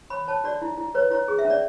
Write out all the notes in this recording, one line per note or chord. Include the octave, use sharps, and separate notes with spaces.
C#5 B5
C#5 A5
F#4 D5
E4
E4
B4 C#5
E4 C#5
G#4
E5
C#4
D5